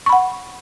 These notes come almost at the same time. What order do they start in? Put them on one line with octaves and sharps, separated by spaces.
C#6 B5 F#5